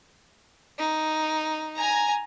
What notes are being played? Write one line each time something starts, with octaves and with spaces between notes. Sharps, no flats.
D#4
G#5 A#5